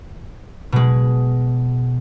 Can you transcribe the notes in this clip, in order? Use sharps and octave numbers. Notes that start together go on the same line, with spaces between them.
B2 G#3